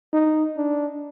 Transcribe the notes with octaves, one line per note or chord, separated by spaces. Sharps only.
D#4
D4